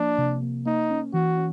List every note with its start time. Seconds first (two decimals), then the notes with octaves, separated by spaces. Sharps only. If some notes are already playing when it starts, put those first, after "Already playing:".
Already playing: F3 A#3 D4
0.18 C3
0.42 A#3
0.66 A#3 D#4
0.90 C#4
1.13 E3 F#4
1.37 C#4